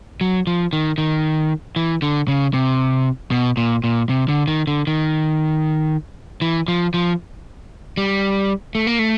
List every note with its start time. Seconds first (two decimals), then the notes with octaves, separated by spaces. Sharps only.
0.21 F#3
0.47 F3
0.73 D#3
0.98 D#3
1.76 E3
2.02 D3
2.28 C#3
2.54 C3
3.31 B2
3.57 A#2
3.84 A#2
4.09 C3
4.29 D3
4.48 D#3
4.67 D3
4.87 D#3
6.42 E3
6.68 F3
6.94 F3
7.97 G3
8.75 A3
8.87 A#3
8.99 A3